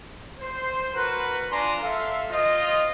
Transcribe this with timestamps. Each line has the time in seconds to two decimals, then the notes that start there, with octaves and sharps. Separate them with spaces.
0.40 C5
0.95 F#4 A#4 B4
1.52 D4 F4 G#5 A#5 C6
1.83 A4 E5 F5
2.30 F4 C5 D#5